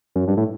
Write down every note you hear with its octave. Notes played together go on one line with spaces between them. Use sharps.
F#2
G2
A2